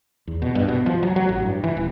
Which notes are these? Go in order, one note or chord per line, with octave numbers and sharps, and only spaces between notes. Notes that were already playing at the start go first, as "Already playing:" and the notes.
E2
B2
G2
B2
F3
F#3
F#3
A1
G2
E3
D#1